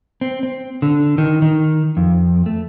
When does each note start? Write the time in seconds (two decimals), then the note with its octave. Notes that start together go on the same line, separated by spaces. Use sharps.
0.21 C4
0.43 C4
0.82 D3
1.18 D#3
1.42 D#3
1.97 F2
2.46 A3